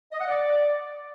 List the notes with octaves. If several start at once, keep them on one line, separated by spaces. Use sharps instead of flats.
D#5
F#5
D5